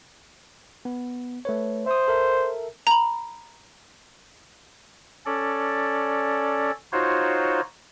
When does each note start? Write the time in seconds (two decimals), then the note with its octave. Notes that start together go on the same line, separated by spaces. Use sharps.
0.85 B3
1.45 A3 B4 C#5
1.86 C5 E5 D#6
2.08 A4 A#4 E5
2.87 A#5 B5
5.26 C#4 A4 D5
6.92 D#4 F4 F#4 C5 C#5